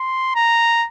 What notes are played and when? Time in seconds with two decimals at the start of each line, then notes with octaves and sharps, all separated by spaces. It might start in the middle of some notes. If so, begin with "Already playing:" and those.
Already playing: C6
0.35 A#5